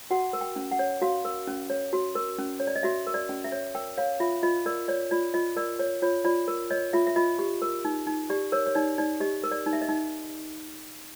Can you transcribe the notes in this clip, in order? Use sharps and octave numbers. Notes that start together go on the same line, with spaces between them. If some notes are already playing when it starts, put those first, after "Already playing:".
F#4 F#5
A#4
G5
C#4
F#5
C#5
F#4 F5
A#4
C#4
C#5
F#4
A#4
C#4
C#5
D5
D#5
F#4 E5
A#4
D5
C#4
E5
C#5
A#4 G5
C#5 F5
F4 E5
F4 D#5
A#4 D5
C#5 D5
F4 D5
F4 D#5
A#4 D5
C#5
F4 C#5
F4 D5
A#4
C#5 D#5
F4 E5
E5
F4 D#5
G4
A#4
D#4
D#4
G4 D5
A#4 C#5
C#5
D#4 D5
D#4 D5
G4 D#5
A#4
D5
D#4
E5
D#5
D#4